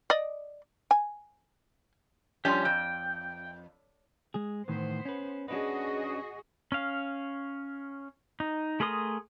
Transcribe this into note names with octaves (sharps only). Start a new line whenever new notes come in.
D5 D#5
G#5
F3 G3 C#4 G4
F2 G5
G#3 G#4
A2 D#3 E3 B3 C5
C#4 B4
C#4 D4 F#4 G#4 B4 D#5
C#4 F5
D#4
A3 G#4 A#4 C6 D#6